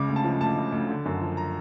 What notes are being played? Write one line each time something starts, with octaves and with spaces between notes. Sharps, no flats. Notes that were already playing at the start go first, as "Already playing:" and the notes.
Already playing: C#2 C#3 D6
D2
A5
F3
D2 A5
C#3
D2
D3
F#2
F3
A#5